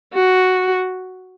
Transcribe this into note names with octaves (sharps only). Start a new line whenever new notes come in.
F#4